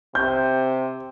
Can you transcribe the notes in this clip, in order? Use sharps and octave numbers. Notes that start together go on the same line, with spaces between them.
C3 G6